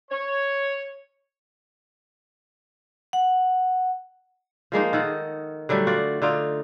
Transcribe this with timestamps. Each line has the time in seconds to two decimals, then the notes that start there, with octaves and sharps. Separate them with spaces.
0.11 C#5
3.13 F#5
4.72 F3 G#3 A#3 D#4
4.93 D#3 A4 F#5
5.69 D3 F#3 G3 A3
5.87 F4 F#4 D5
6.22 D3 D#4 F4